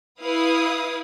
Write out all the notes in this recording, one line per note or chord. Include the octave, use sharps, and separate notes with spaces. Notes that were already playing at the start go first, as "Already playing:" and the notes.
E4 B4 F5 D#6